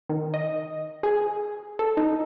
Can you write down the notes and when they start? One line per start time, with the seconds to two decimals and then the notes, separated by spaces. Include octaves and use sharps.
0.09 D#3
0.34 D#5
1.03 G#4
1.79 A4
1.97 D#4